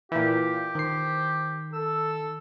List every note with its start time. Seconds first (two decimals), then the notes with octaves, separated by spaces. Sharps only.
0.12 A#2 E3 G4 F5
0.75 D#3 C5 C7
1.73 A4 E6